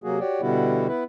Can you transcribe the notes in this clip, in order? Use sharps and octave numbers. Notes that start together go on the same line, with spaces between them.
C3 F#3 A#3 F#4 G#4
F#4 G4 C#5 D5
B2 D3 G3 B3 E4 F#4
B3 E4 B4